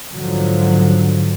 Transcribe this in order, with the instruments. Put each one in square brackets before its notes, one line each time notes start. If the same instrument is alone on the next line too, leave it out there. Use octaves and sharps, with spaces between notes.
[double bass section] G#2 D3 F3 F#3